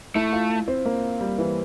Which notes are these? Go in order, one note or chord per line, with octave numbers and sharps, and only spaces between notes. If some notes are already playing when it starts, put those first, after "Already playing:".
A3 E4
F4
C4
A#3
G3
E3